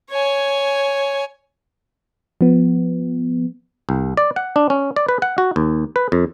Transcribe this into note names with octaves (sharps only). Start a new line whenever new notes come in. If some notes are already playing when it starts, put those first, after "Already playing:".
C#5 G#5
F3 B3
C2
D5
F#5
D4
C#4
D5
B4
F#5
F#4
D#2
B4
F2